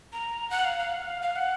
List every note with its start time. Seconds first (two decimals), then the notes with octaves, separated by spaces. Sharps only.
0.13 A#5
0.50 F#5
0.64 F5
0.79 F5
0.93 F#5
1.07 F5
1.22 F5
1.36 F#5